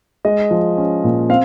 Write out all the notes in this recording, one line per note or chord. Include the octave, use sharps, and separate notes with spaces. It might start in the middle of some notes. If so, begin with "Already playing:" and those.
G#3 D#5
F3
C#4
A#2
C4 F5